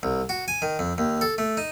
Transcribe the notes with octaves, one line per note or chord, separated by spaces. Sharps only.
C2
F#4
G#5
D#3
F2
D#2
A4
A3
D#4